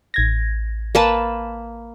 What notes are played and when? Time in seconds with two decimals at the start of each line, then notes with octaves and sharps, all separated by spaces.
0.14 A1 G#6 A#6
0.95 A#3 B4 A5